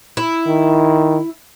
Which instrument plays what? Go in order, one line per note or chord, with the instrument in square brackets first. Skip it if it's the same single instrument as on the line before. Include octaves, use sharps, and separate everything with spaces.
[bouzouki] E4
[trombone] D#3